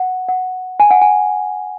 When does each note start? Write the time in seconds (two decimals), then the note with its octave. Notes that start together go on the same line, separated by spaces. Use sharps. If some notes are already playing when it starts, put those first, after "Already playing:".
Already playing: F#5
0.29 F#5
0.80 G#5
0.91 F#5
1.02 G#5